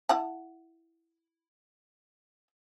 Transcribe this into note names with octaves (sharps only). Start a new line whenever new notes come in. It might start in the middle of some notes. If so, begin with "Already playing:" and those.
E4 F#5 A5